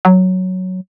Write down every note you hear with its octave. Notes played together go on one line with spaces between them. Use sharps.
F#3